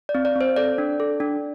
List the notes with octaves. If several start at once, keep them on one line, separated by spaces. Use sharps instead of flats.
D5
C4
D5
C4 C5
A4 D5
D4
A4
D4